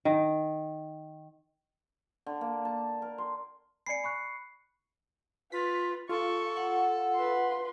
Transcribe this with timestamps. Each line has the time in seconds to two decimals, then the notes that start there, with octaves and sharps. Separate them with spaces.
0.05 D#3
2.26 D3
2.41 A#3
2.65 A5
3.02 A#4
3.18 C6
3.86 D5 G#5 B5 C7 C#7
4.04 B5 C#6 F#6
5.52 F4 B4 B6
6.09 F4 A4 C#6
6.57 F#5
7.15 B4 C6